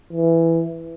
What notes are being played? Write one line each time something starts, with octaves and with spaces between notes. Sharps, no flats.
E3